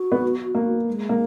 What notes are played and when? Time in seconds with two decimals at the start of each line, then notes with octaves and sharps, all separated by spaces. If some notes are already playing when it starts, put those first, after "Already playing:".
Already playing: F#4
0.12 B3
0.55 A#3
0.88 G#3
1.09 A#3